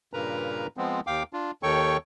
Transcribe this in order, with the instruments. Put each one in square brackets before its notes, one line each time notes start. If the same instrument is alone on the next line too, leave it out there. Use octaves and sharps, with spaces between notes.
[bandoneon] G2 A#2 C#3 A#4 B4 A#5
F3 G#3 B3 C4
D#2 F5 G5 D6
D4 F4
D#2 D#3 A4 C#5 G5 C#6